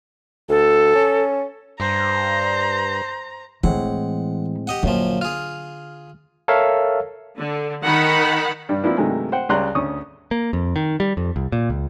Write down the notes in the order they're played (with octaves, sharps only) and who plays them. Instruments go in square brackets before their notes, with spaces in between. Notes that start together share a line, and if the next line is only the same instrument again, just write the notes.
[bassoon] D2 [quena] A4
[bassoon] C#4
[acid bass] G2 [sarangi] C5 [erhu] A#5
[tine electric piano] A2 G#3 C4 [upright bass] E3 [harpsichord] F#5
[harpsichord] G4 D#5 F#5
[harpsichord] F#2 A#2 F3 [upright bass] D3
[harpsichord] F4 G#4 [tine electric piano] F6
[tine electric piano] A4 A#4 C#5 E5 F5
[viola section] D3
D#3 D#4 F#5 B5
[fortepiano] G2 G3
F3 A#3 C4 D4 E4 B4
G2 C3 D#3 F#3 G#3 A3
C5 F#5 G5
C#2 C#3 G3 A#5 C6 F#6
D2 C#4 C#6 D#6
[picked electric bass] A#3
F2
D#3
G3
F2
C2
A#2
C#2